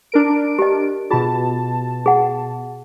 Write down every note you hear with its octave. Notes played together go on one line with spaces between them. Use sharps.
D4 A#4 D7
G4 D#5
B2 F4 G#4 A5
G#4 F#5